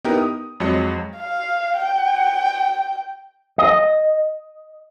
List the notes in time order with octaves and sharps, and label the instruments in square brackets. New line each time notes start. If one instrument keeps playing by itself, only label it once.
[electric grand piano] B3 D#4 E4 G4 A#4
D#6
F2 F#3 G#3 D#5 C#7
[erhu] F5
G5
[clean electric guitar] D#5